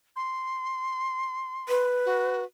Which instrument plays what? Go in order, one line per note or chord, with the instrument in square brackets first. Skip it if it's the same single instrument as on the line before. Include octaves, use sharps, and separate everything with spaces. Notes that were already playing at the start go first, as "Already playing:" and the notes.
[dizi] C6
[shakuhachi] B4
[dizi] F#4